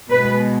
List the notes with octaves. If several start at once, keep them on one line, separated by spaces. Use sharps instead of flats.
B2 G#3 B3 B4